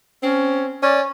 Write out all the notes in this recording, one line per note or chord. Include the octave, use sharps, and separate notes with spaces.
C4 C#4
C#4 D5